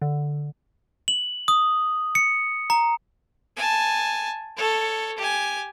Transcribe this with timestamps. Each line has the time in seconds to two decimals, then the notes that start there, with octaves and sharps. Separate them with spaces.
0.02 D3
1.08 F#7
1.48 D#6
2.15 C#7
2.70 A#5
3.56 G#5 A5
4.57 A4 C#5
5.18 G4 G#5